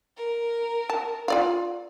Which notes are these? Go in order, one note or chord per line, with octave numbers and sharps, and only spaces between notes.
A#4
A5
F4 D5 F5